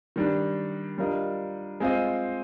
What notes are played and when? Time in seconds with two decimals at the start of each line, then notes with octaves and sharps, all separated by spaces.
0.16 D#3 G3 D4
0.98 G3 D4 F4 A#4 D#5
1.80 G#3 C4 F4 C5 D#5